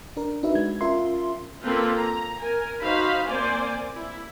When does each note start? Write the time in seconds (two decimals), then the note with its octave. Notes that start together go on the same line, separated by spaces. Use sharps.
0.17 D4 A#4
0.43 D4 D#4 F#4 B4 E5
0.55 G#3 G#6
0.81 C#4 F4 A#4 E5 C6
1.62 A#3 C4 F4 A4 B4
1.95 A#5
2.37 A#4 G#5
2.81 D#4 F#4 C5 F5 B5
3.27 A#3 C4 C5 D5 G#5
3.95 E4